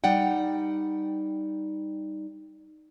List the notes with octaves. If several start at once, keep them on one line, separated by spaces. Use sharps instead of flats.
G3 D#4 D5 F#5 G5